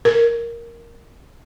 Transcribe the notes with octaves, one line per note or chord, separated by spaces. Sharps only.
A#4